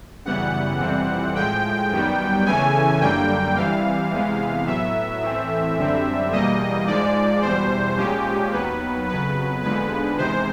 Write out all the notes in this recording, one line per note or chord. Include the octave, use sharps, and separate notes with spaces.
F#2 C#3 E3 G3 B3 F#5
F2 C3 E3 G3 C4
A2 F3 G#3 G5
F#2 D#3 G3 B3
E2 C#3 E3 A3 C#4 G#5
F#2 D3 G3 A#3 G5
C3 E3 G3 F5
E2 C3 E3 G#3 B3
A2 F#3 B3 E5
A2 E3 A3 C4
F#2 D3 G3 C4
E2 B2 G3 A#3 D#5
G#2 F3 G#3 D5
E2 B2 G3 C5
A#2 F3 G#3 C#4 G4
D#2 D#3 F#3 B3 B4
F2 C#3 F#3 B3 B4
D#2 D3 F3 G#3 B3 B4
E2 C3 D#3 G#3 C5